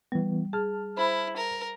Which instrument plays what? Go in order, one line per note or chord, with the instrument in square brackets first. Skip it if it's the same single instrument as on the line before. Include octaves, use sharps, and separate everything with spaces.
[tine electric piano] E3 B3 [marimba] G3
[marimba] G#4 [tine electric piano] A5 F6
[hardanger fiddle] E4 [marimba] C5 B5
[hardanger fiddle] A#4